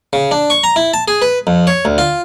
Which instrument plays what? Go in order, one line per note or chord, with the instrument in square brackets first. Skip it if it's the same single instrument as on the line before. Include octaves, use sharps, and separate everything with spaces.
[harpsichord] C#3
D4
C#6
A#5
E4
A5
G#4
B4
F2
C#5
D2
F4